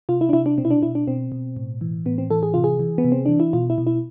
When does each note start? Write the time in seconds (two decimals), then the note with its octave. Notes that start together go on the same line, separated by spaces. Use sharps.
0.09 C3 F4
0.21 E4
0.29 D4
0.33 C3 E4
0.46 D4
0.58 B2 C4
0.65 E4
0.70 D4
0.83 B2 E4
0.95 D4
1.08 B2 C4
1.32 B2
1.57 A2
1.81 E3
2.06 A2 B3
2.18 C4
2.30 E3 A4
2.43 G#4
2.54 C3 F4
2.64 G#4
2.80 E3
2.98 B3
3.04 C3
3.12 C4
3.26 E3 D4
3.40 E4
3.53 B2 F4
3.70 E4
3.78 B2
3.87 E4